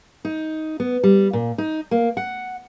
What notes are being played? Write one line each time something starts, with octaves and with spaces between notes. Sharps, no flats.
D#4
B3
G3
A#2
D#4
A#3
F#5